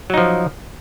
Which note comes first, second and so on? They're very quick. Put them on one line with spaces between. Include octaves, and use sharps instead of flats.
F#3 D#4 F3